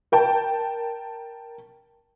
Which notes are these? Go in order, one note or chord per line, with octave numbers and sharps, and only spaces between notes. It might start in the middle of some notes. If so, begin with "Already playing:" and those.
A#4 G5 A5